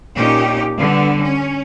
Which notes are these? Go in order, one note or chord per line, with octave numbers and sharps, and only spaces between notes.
A#2 C#4 D#4 G4
D3 G3 B3
C#4